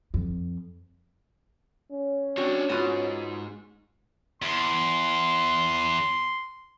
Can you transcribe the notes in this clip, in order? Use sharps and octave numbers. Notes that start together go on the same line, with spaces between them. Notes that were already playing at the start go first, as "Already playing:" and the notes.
F2
C#4
C4 D4 F#4 C#5
G#2 B3 F4 F#4
E2 C6